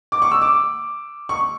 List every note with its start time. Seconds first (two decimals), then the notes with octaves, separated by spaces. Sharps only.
0.12 D6
0.22 C#6
0.31 E6
0.42 D6
1.29 C#6